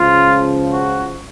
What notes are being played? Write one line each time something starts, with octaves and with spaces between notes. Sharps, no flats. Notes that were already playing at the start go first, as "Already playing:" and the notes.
Already playing: C#2 C#3 F3 F4
F#4